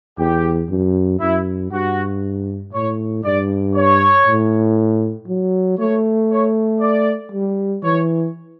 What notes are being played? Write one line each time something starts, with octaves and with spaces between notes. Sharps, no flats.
E2 G4
F#2
F#2 E4
G2 F#4
A2 C#5
G2 D5
C#5
A2
F#3
A3 C#5
C#5
D5
G3
E3 C#5